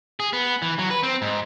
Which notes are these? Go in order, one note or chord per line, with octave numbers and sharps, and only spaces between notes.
G#4
B3
E3
F#3
B4
C4
G#2